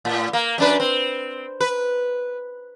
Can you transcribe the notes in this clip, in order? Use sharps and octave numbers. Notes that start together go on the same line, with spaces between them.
A2
A#3
F#2 D4 B4
C4
B4